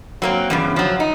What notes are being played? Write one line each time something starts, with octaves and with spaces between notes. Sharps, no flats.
F#3 A#3 C4
E2 G2 C#3
F3 F#3
D#4